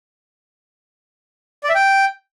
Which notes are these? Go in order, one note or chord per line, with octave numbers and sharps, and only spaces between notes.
D5
E5
G5